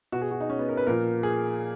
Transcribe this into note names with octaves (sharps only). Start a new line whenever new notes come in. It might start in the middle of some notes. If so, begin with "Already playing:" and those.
B2 F#4
G#4
F#4
D#4
C#4
B3
A#4
B4
A#2 F3 A#4
G#4